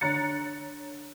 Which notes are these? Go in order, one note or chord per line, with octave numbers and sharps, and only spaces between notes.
D3 C#5 A#5 F#6 A6 C#7